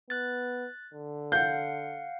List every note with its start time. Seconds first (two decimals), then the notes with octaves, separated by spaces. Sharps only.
0.10 B3 F#6 A6
0.94 D3
1.32 F5 F#5 G6